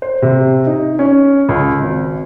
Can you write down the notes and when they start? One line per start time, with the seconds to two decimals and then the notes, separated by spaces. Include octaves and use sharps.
0.02 C5
0.22 C3
0.67 D#4
0.99 C#4
1.49 C#2
1.82 G#1